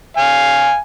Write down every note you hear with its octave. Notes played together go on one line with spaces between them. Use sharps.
F5 G#5